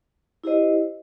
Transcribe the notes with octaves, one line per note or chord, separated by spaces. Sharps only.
E4 G4 C5 D#5